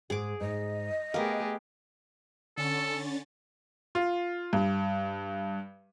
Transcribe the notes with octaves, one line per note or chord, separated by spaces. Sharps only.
G#2 G#4 D6
G#2 D#5
A3 B3 G4 G#4 A#4 F5
D3 C#4 A4 A6
F4
G2